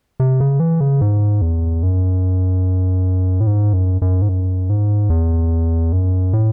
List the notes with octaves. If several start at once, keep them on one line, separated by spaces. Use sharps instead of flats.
C3
C#3
E3
C#3
G#2
E2
F#2
A2
G#2
F#2
F#2
G#2
F#2
G#2
E2
F#2
A2